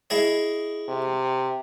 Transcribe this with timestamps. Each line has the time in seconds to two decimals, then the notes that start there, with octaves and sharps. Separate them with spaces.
0.10 E4 G#4 D#5
0.88 C3